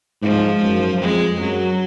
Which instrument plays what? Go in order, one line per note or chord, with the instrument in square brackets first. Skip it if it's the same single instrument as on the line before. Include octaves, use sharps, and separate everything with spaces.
[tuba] G#2 [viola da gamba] F3
[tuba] F#2
[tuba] F2 [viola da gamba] G#3
[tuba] F#2 [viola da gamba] F#3